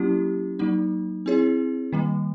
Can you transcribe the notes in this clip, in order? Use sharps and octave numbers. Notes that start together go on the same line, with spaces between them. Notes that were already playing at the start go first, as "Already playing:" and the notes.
Already playing: F#3 A#3 C#4 E4 G4
F#3 A#3 D#4
C4 E4 G#4 C#5
D#3 G3 A#3